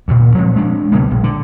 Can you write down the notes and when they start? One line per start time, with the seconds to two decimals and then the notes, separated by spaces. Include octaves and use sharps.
0.08 D2 A#2
0.35 F3 G#3 C4
0.56 G#3 D4
0.92 C#2 B2 G3 A#3
1.11 A#1
1.24 D3